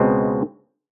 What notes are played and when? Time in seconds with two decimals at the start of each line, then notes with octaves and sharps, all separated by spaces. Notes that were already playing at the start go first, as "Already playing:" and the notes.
Already playing: C#2 B2 G#3 C4